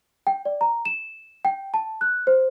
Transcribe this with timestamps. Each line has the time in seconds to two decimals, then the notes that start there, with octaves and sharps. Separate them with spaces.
0.27 G5
0.45 D5
0.61 A#5
0.85 E7
1.45 G5
1.74 A5
2.01 F#6
2.27 C5